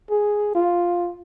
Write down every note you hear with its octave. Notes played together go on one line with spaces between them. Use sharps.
G#4
F4